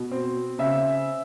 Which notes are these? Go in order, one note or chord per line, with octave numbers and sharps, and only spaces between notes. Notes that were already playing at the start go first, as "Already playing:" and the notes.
Already playing: B2
C4
C#3 E5